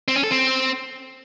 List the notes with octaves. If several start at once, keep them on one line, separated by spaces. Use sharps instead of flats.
C4
C#4
A4
C4